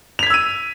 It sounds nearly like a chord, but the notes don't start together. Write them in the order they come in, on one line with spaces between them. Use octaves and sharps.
F7 B6 G#6 E6 D#7